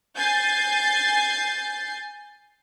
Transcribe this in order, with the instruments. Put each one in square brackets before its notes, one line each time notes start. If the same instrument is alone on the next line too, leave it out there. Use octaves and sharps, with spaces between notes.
[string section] G#5 G6 A6 C7